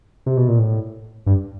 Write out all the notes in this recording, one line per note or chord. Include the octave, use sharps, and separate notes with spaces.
C3
B2
A#2
A2
G2